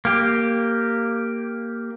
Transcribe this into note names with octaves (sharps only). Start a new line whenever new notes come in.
A#3 G4